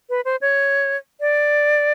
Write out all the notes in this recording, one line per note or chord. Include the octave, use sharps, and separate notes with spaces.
B4
C5
C#5
D5